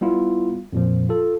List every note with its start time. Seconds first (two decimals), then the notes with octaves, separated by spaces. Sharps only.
0.01 G3 B3 E4 F4
0.73 F2 A#2 F3
1.09 F4 A4